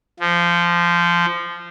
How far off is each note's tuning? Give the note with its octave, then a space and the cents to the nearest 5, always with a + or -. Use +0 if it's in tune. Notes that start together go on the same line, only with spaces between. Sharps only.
F3 -15